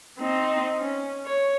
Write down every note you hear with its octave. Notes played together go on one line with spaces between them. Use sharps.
C4 D#4
C#4
C#5